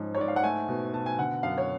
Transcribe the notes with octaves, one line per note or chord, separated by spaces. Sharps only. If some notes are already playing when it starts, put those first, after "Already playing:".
Already playing: G#2 F3 C#4
C#5
G#2 D5
F5
F#5
A3 G#5
B2
B2 A5
G#5
D3 F#5
F#2 F5
C#5